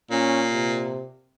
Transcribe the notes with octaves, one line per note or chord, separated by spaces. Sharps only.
A#2 C#4
C3